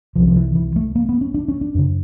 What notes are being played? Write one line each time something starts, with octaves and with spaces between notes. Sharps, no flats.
C2 C3 F3
F3
E3
E3
A3
A#3
B3
C#4
D4
C#4
D4
F#2 C#3